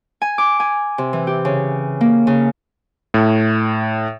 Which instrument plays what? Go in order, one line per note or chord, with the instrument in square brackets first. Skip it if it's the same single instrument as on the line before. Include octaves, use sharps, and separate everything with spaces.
[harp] G#5
D6
G#5
C3
E3
G4
C#3
A#3
C#3
[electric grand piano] A2